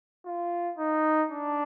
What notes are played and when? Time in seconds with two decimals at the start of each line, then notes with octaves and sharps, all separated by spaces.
0.25 F4
0.78 D#4
1.31 D4